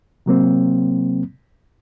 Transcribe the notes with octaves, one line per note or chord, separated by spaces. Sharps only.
C3 F#3 A#3 C4